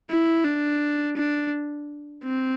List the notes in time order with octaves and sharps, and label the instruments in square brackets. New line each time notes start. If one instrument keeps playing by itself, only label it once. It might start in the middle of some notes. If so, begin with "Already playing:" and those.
[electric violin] E4
D4
D4
C4